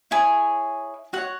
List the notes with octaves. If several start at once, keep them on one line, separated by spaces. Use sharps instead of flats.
E4 G#4 C#5 G#5
F#4 C#5 F#5